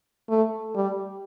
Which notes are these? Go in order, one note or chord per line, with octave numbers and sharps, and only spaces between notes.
A3
G3